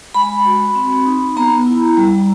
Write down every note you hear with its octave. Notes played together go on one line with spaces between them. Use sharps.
G#3 B5
F#4
C4
D#4
B3 A#5
E4
G3